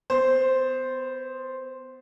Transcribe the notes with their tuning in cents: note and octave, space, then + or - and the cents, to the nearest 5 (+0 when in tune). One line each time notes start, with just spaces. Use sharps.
B3 +30 C5 +0